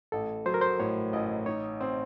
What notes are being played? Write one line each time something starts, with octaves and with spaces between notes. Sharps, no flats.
A1 A4
F#3 C5
A#4
C5
A2 C#5
A1 D#5
D#4 C#5
C4 C5